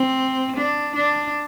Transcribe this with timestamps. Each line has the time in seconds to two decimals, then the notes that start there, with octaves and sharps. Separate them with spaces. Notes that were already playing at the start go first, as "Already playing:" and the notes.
Already playing: C4
0.57 D4
0.96 D4